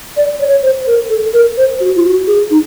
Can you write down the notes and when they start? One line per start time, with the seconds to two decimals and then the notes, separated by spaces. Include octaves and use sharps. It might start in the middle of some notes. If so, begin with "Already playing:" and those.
0.17 D5
0.40 C#5
0.63 C5
0.87 A#4
1.10 A4
1.33 A#4
1.57 C5
1.80 F#4
1.96 F4
2.04 F#4
2.27 G#4
2.51 D#4